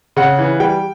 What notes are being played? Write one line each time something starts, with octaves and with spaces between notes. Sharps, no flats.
C#3 F#5
E3
G3 G5